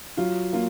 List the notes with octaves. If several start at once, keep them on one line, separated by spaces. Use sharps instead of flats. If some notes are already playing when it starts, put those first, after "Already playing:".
F#3 F4
A#3 F4